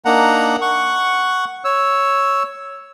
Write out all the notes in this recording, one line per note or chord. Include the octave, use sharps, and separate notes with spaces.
A#3 D4 D#4 F#5 A#5
F#5 C#6
C#5 E6